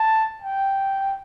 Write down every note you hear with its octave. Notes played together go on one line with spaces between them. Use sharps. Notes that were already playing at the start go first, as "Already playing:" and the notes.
Already playing: A5
G5